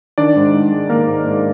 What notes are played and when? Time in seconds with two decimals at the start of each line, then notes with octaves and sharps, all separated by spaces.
0.18 D#3 D4 D5
0.36 G#2
0.54 G#2
0.71 G#3
0.90 D#3 A#3 A#4
1.07 G#2
1.27 G#2